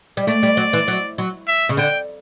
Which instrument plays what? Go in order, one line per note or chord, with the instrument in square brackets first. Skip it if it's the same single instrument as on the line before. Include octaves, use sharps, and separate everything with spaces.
[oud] G3
[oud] A3 [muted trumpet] D5
[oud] G3
F#3
E3
F#3
F#3
[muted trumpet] E5
[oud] C#3
[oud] D3 [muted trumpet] G5